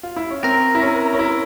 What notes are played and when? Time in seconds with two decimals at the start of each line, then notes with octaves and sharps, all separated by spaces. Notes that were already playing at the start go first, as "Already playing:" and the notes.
0.03 F4
0.16 E4
0.30 C#4
0.44 C4 A#4
0.75 E4
0.82 C#4
1.13 C#4
1.19 E4